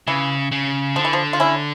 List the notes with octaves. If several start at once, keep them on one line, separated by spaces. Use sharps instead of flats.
C#3 E3
C#3
D3 F3
E3
F3
F4
C#4 E4